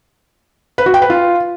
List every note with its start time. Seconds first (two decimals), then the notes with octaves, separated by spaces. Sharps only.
0.78 B4
0.86 F#4
0.94 G5
1.02 B4
1.10 F4